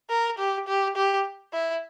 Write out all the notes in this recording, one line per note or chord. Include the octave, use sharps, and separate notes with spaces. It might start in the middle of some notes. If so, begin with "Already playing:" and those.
A#4
G4
G4
G4
E4